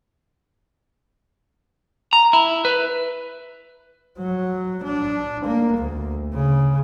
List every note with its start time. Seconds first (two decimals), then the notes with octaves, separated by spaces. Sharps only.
2.13 A#5
2.33 E4
2.65 B4
4.18 F#3
4.84 D4
5.45 A#3
5.77 D2
6.33 C#3